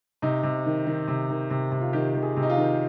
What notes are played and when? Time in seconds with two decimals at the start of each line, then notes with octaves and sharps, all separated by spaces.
0.22 C3 D#4
0.43 C3
0.66 D#3
0.87 D#3
1.08 C3
1.30 D#3
1.50 C3
1.72 C3
1.81 F4
1.93 D#3 G4
2.15 D#3
2.22 G#4
2.37 C3
2.42 D#4
2.50 F4
2.57 D#3